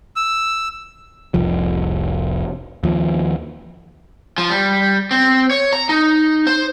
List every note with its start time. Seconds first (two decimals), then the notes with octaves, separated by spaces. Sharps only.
0.16 E6
1.34 F1 C2 F3
2.84 D#2 F3
4.38 F3
4.50 G3
5.11 C4
5.51 C#5
5.73 A#5
5.89 D#4
6.47 C5